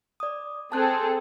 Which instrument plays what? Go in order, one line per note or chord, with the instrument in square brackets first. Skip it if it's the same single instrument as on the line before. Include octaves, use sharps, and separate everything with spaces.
[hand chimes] D5 D#6
[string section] C4 G#4 A4 [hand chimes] A5 F#6